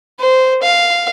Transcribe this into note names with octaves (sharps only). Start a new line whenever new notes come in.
C5
F5